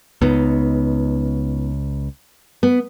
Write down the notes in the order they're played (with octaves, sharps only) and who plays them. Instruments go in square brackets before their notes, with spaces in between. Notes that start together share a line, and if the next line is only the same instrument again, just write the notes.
[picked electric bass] C#2 [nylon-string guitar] B3 D#4
[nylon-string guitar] B3